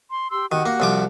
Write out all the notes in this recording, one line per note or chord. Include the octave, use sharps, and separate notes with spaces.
C6
G4 C6 E6
D#3 F#4 G4 F#5
A#3
C2 F3 D6